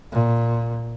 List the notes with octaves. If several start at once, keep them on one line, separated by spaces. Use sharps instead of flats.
A#2